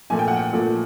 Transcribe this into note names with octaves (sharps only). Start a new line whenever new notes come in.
A#2 F3 A3 G#5
G5
F#5
G5
A#2 F3 A3